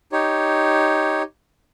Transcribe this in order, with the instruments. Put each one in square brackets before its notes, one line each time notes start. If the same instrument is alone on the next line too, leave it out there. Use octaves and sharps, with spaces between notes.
[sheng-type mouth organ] D#4 G4 C#5